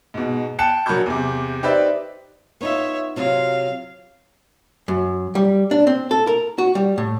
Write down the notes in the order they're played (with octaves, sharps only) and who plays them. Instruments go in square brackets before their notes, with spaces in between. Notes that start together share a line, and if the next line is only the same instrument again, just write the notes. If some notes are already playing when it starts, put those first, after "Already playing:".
[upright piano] G#2 B2
G5 A5 F#6 C#7 E7
A#1 F#3 A#4 B5 C#6 G6
E2 C3
D#4 G4 B4 C5 D5 E5
[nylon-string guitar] B3 D#4 F4 [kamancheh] C#5 E5
[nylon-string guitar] C3 F#3 F4 [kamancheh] F5
[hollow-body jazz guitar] F#2
G3
D4
C4
A4
A#4
F#4
G3
A2